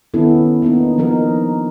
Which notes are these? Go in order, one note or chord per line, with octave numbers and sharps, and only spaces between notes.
D#3 B3 C#4 E4 A4
A#3 B3 D4 D#4
F3 B3 D#4 A#4